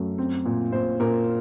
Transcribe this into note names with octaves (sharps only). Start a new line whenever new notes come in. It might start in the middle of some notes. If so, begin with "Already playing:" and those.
Already playing: F#2 A3
C4
A#2
A#2 C5
A#2 A#4